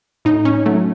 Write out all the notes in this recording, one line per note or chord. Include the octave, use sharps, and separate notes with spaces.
A2 D#4
C#4
F#3 A3